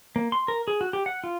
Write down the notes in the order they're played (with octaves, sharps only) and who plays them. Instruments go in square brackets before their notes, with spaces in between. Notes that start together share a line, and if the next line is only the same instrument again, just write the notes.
[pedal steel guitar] A#3
C6
A#4
G#4
F#4
G4
F#5
F4